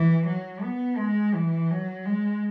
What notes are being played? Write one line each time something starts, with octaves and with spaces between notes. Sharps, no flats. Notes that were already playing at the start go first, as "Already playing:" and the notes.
Already playing: E3
F#3
B3
G#3
E3
F#3
G#3